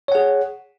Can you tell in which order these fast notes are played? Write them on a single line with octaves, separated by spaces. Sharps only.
C#5 F#5 G#4